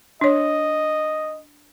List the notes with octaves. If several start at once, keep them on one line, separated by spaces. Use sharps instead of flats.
D4 C#5 D#5